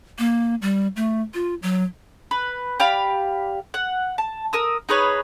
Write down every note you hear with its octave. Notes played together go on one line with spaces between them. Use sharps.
A#3
G3
A3
F4
F#3
B4
G4 D5 F5 B5
F#5
A5
A#4 D#6 E6
D#4 G#4 B4 C#5